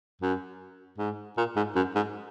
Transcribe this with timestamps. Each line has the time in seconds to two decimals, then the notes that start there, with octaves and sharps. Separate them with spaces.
0.22 F#2
0.98 G#2
1.38 A#2
1.56 G#2
1.76 F#2
1.95 G#2